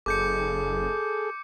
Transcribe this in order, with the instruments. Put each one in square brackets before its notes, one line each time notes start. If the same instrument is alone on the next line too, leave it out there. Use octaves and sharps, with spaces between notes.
[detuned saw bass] F#1 [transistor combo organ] G#4 A4 [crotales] D6 G6 C#7